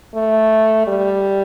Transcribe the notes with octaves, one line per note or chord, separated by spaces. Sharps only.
A3
G3